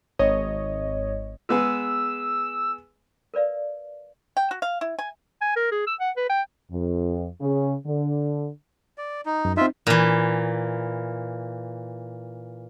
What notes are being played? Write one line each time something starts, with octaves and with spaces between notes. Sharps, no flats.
G#1 C#5 D#5
G#3 B3 G#4 E6
A#4 B4 D5 F5
G5
F#4
F5
E4
G#5
G#5
A#4
G#4
E6
F#5
B4
G5
F2
C#3
D3
D5
D#4
F#2
C4 D#4 F4 E5
A#2 E3